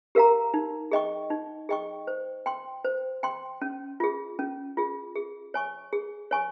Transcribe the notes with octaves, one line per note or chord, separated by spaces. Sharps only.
G4 A#4 F5 A#5
D#4
G#4 D#5 G5 C#6
D#4
G#4 D#5 G5 C#6
C5
G5 C6
C5
G5 C6
C#4
F4 G#4
C#4
F4 G#4
G#4
C#5 G#5 C#6
G#4
C#5 G#5 C#6